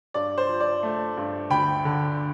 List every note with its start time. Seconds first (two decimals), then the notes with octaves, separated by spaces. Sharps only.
0.14 G2 D5
0.38 C5
0.49 F3
0.60 D5
0.83 A3
1.17 G2
1.50 D2 G5 B5
1.85 D3